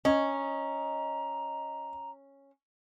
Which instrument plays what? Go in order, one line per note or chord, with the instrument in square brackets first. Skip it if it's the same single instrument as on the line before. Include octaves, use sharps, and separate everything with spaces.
[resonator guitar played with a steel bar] C#4 [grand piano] D#5 [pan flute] A#5